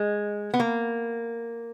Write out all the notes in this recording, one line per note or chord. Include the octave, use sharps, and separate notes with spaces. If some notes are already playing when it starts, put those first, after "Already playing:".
Already playing: G#3
B3
A#3